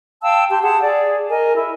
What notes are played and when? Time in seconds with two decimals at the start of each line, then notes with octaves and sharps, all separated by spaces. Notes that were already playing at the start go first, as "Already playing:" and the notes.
0.22 F5 G5 A5 E6
0.50 G4 A5 C6
0.62 G#4 F#5 A5
0.82 G#4 D5
1.29 A#4 D#5 G#5
1.56 E4